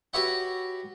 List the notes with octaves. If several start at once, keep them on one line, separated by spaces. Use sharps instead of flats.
F#4 G4 B4 C#5 E5 F#5